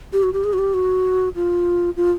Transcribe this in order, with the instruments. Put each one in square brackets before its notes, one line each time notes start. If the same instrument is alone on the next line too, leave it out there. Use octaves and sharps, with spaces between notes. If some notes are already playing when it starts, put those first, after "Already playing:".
[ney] G4
F#4
G4
G#4
F#4
G4
F#4
F4
F4